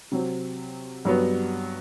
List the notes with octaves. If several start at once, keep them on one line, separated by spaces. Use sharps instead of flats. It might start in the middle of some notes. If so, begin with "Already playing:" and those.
C3 F#3 C4
G2 F#3 B3